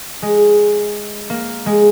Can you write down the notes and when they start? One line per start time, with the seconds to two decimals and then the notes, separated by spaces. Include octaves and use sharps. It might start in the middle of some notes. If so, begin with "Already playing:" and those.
0.22 G#3
1.30 A#3
1.66 G#3